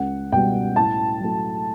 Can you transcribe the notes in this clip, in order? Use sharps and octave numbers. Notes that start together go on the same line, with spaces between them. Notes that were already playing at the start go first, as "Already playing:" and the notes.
Already playing: C#2 F#5
B2 G3 B3 G5
A2 A5
F#3 A3